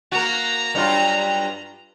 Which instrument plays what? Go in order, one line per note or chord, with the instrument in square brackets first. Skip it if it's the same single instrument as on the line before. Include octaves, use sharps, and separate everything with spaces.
[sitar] A#3 F#4 [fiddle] A#5
[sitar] G2 F#3 F4